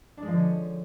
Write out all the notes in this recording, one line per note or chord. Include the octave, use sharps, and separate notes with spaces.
D4
G#3
F3
D3
C#4